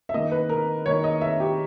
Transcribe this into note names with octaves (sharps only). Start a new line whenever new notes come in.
E5
D#3 A#3 D#5
B4
A#4
D#3 A#3 C#5
D#5
E5
G4